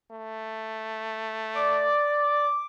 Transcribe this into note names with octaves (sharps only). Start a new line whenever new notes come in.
A3
D5 D6